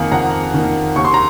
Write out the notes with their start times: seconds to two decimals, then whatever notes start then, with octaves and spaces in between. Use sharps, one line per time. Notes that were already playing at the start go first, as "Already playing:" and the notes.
Already playing: F2 D#3 A#3 F5 F#5 G#5
0.12 F2 F#5 A#5
0.54 D#3 A#3
0.96 D#2 C#6
1.05 C6
1.14 A#5